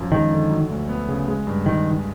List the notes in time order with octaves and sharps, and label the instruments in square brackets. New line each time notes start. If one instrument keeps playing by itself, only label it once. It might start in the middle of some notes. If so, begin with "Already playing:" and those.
Already playing: [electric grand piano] F#2 F3
[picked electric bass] D#3 [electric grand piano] G#3
[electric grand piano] D3
F#3
D2
B3
C#3
G#3
G2
[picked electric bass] D#3